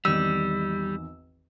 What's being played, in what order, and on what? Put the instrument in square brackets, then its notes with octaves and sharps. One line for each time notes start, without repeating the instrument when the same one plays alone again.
[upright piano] G#1 E2 D#3 [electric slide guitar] G3 [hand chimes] E6